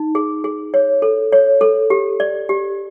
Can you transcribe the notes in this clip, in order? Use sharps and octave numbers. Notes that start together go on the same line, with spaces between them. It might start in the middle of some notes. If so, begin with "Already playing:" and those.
Already playing: D#4
G#4
G#4
C#5
A4
C#5
A4
G4
D5
G4